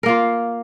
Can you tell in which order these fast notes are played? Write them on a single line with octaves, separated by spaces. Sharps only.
A#4 A#3 F4